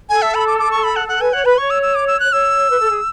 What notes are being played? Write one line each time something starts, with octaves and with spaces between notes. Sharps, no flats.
A4 G#5
E5
B5
D6
D6
C#6
B5
F#5
F#5
B4 G#5
C#5 F#5
B4 B5
C#5 C#6
E6
E6
D6
E6
F#6
C#5 E6
B4
A4
G#4